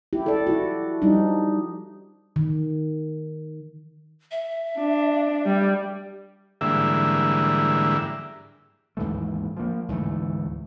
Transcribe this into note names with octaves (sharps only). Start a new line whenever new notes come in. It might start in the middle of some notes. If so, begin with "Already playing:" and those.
E4 G4
A4 D5
E4 F#4
F3 G3 D4 D#4
D#3
E5
D4
G3
G#2 D3 E3 G3 A#3 E5
D#2 G#2 E3 A3
F3 A#3
D2 G#2 E3 A3